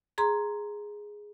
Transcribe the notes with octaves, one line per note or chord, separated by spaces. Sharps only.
G#4 A#5 C6